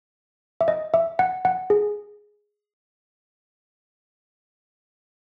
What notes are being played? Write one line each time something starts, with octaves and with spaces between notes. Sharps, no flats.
E5
D#5
E5
F#5
F#5
G#4